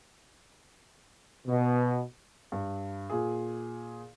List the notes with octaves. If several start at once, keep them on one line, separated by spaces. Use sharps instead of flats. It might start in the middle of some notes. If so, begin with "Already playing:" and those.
B2
G2
A#2 G#4